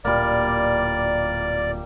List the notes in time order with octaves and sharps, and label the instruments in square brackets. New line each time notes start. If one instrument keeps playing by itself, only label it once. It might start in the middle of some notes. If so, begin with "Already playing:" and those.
[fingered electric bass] D1 A#2 [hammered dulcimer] G3 A#3 [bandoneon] D5